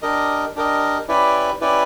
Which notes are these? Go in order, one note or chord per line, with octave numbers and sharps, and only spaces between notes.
D4 G4 A#4 D#5
D4 G4 A#4 D#5
C#4 E4 G4 B4 D5
C#4 E4 G4 B4 D5